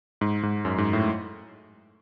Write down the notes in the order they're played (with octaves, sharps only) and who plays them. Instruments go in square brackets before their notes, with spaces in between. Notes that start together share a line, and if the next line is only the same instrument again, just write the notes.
[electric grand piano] G#2
G#2
F#2
G#2
A2